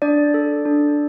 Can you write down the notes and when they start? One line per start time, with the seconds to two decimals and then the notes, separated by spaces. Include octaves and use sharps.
0.02 D4 D5
0.34 A4
0.65 D4